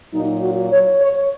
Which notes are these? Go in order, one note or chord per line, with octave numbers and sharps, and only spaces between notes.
A#2 F#3 D#4
F#4
C#5
C#5